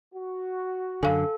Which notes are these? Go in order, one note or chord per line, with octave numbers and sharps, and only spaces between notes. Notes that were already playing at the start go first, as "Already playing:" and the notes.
F#4
F#2 D3 A4 F5 G#5